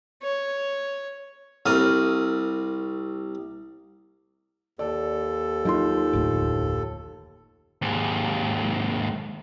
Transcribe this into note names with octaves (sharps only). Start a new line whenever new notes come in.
C#5
C2 A#4 D#6
D#2 A4 D5
F#3 D#4 F4 C6
F1 D2 A2
D#2 G#2